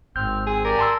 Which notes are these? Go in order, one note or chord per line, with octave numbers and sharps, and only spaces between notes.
G#1 C4 F6 G6
C4 G#4
G4 A#4 D5 G#5
A5 C6 E6